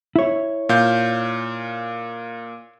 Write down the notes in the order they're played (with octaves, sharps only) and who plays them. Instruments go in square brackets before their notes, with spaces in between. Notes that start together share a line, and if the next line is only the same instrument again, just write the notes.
[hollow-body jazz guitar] E4 C#5
[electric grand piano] A#2 F5 G6